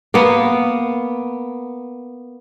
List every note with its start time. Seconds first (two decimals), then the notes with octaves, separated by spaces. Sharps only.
0.14 A#3 B3